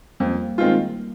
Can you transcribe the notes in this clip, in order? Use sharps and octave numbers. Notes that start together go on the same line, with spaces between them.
F2 G3 A#3
D#3 G#3 C4 F4